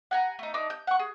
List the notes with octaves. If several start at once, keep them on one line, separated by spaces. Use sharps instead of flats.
F#5 G#5 A#5
A3 D#4
D4 D#4 D6
G6
F#5 C#6
G#4